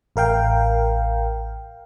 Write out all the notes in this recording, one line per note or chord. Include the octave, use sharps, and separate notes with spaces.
A1 A#4 F5 G5